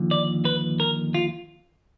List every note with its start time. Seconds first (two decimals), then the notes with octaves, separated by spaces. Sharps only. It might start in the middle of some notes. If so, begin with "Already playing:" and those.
Already playing: D#2 D3 F3
0.11 D5
0.45 B4
0.80 A#4
1.14 F4